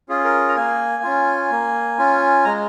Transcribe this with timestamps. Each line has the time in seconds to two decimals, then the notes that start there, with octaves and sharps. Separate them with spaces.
0.09 C#4 F4 G#4
0.24 A#4
0.49 A#5
0.56 A#3 G#5
1.03 C#4 F4
1.51 A#3
1.98 C#4 F4
2.45 G#3 A#5